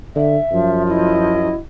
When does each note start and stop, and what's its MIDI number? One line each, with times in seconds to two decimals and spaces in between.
0.16 0.37 50
0.16 0.82 76
0.51 1.52 42
0.51 1.48 53
0.87 1.55 64
0.87 1.57 66
0.87 1.57 75